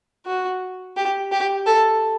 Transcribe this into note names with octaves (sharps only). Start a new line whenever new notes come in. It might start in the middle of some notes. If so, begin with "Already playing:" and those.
F#4
G4
G4
A4